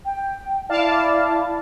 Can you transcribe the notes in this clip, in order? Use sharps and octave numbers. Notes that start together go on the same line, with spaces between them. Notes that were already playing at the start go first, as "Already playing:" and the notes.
G5
E4 D5 F5 A5